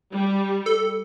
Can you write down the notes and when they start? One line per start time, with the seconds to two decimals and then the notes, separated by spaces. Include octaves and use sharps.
0.12 G3
0.66 A4